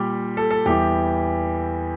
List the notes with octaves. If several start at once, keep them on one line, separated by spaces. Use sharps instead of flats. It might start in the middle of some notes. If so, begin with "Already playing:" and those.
Already playing: A#2 G3 G4
A4
A4
E2 E3 G3 G4